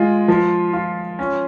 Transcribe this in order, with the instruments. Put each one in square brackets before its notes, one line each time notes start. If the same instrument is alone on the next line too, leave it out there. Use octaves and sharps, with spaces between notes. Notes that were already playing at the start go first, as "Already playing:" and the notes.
Already playing: [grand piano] G#3 F4
F3
F4
C#4